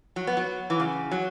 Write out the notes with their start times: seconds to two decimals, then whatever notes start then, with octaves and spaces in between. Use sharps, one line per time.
0.16 F#3
0.27 B3
0.37 F#3
0.70 E3
0.80 C#3
1.11 F#3